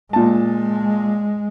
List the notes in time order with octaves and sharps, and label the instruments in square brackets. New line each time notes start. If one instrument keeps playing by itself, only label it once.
[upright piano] A#2 A5 [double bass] G#3